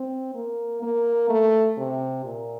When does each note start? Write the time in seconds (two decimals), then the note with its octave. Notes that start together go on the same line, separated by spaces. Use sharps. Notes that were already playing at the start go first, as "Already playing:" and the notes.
Already playing: C4
0.35 A#3
0.83 A#3
1.29 A3
1.78 C3
2.24 A#2